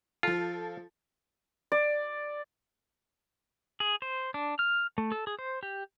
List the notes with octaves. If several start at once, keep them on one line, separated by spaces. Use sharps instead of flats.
F3 F4 A4
D5
G#4
C5
D4
F6
A3
A4
G#4
C5
G4